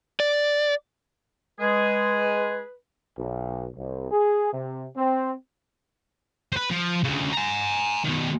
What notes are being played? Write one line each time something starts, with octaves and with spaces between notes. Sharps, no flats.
D5
G#3 G#4 B4
B1
C2
G#4
C3
C4
B4 C5
F3
D2 C#3
G#5 A#5
B2 D#3